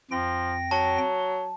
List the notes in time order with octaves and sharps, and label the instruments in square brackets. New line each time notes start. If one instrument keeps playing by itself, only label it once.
[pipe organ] F2 G5 A#6 [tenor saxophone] F3
[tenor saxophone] F#3 [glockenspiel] A5